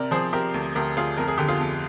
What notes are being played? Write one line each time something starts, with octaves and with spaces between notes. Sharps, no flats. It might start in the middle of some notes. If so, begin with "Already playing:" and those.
Already playing: C3 A#4 D5
F3 G#4 C5
C3 G4 A#4
D2
D2 G4 A#4
D2 F4 G#4
F2 A#4
G#4
D3 G4
F4 G#4
F2